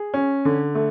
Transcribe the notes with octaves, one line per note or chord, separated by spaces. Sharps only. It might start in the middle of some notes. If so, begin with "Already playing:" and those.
Already playing: G#4
C#4
D3
A3